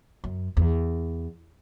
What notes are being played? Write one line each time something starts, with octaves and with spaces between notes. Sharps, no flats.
F#2
E2